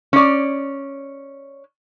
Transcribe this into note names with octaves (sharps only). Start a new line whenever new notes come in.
C#4 D5